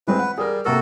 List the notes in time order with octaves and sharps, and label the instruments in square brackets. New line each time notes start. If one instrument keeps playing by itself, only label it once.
[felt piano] E3 G#3 C4 [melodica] B4
[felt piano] F#5
[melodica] G3 [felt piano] G#4 A#4
[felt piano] C3 A#3 A#4 [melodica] F#4 A4